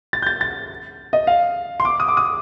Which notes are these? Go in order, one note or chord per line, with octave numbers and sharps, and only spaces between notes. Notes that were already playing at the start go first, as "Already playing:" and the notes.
A6
G6
A6
A6
D#5
F5
C6
D6
D#6
D6
D#6